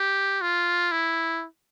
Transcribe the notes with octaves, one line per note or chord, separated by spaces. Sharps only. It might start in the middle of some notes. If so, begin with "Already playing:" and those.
Already playing: G4
F4
E4